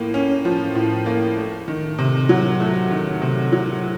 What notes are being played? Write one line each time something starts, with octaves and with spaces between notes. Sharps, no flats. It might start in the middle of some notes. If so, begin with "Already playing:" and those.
Already playing: A2 F3 A#3
C#4
F3
A2
A#3
A3
D#3
C3
F#3
A3
D#3
C3
F#3